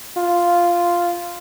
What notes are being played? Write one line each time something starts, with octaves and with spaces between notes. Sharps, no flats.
F4